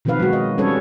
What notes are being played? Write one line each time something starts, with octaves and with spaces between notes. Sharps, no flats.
B2 D#3 F3 C4 B4 F5
F#3 G#3 F#4
D#5
G3 C4 C#4 A4 B4 C#5